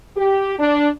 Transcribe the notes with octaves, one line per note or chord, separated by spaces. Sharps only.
G4
D4